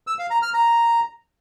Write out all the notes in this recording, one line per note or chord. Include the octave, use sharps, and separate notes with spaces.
E6
F5
A#5
F6
A#5